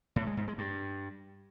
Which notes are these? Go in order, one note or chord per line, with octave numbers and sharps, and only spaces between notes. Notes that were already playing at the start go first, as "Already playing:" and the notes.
A2
G#3
G#2
G#3
G2